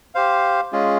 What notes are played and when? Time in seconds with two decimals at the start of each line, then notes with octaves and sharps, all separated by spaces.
0.15 G4 C5 F5
0.72 G#3 C#4 F4 G#4